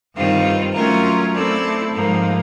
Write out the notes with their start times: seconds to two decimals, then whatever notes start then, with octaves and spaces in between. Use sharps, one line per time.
0.15 G2 D#3 G3 C4 F4
0.74 F#3 A3 C#4 F4 A#4
1.34 A3 C4 E4 A4 D5
1.93 G#2 F3 A#3